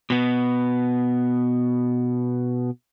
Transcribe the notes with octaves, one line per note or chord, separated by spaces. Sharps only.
B2 B3